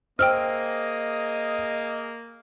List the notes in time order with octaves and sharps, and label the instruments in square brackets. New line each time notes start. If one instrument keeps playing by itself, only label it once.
[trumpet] A#3 [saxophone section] G#4 D#5 [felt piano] C5 [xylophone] G5 E6 F6